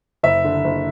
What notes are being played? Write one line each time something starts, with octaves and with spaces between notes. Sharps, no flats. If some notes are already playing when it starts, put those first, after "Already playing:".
F#1 E5
D3
F#1